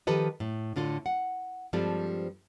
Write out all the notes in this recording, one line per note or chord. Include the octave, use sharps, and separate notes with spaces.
D#3 F3 G4 A4 B4 D#5
A2
A2 D3 F4 A4
F#5
G2 F3 G3 G#3 C4 A4